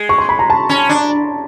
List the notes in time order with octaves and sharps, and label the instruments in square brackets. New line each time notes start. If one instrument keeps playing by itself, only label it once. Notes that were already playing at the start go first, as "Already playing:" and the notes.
Already playing: [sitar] G#3
[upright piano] C#6
C6
B5
A#5
A5
[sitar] C#4
D4